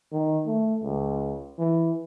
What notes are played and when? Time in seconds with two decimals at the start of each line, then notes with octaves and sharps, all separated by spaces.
0.13 D#3
0.46 A3
0.84 C#2
1.58 E3